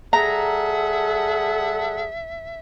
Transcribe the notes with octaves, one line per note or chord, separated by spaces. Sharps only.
G3 G#4 A4 E5 F#5 A#5